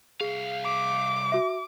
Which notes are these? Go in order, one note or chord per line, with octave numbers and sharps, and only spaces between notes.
C2 G#4 F5
D6
F#4 E5